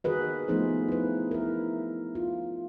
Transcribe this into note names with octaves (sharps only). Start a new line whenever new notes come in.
D#3 F#4 G#4 A#4 B4 D#5
F3 A3 B3 D#4 G#4 C5
E4 B4
E4 A#4
F4